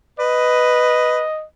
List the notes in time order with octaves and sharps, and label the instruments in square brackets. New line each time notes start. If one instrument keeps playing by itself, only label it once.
[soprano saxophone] B4 [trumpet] D#5